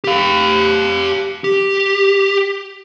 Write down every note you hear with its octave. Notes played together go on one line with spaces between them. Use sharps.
G4 F5
G4